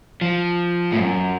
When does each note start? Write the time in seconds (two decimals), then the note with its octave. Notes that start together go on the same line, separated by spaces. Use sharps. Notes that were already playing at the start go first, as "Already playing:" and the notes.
0.21 F3
0.92 A2
0.99 F#2